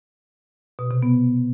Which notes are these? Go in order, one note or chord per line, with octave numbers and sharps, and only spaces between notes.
B2
C3
B3